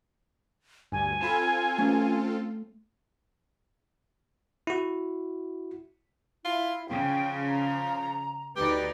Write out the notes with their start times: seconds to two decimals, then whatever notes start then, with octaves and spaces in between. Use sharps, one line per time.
0.92 D2 G2 G#5
1.21 C4 F4 A4 A5 B5
1.78 A3 C#4
4.67 E4 F#4
6.45 E4 F4
6.89 C#3 F3 G5
7.48 A#5
8.56 D2 D#4 G4 B4 D5